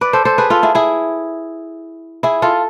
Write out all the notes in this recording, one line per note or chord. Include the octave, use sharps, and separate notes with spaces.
B4 D5
A4 C5
A4 C5
G#4 B4
F4 A4
E4 G#4
E4 G#4
E4 G#4
F4 A4